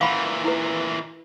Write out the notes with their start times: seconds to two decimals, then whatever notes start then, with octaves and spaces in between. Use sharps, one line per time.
0.01 A#2 E3 F5 F#5 B5
0.44 E4 B4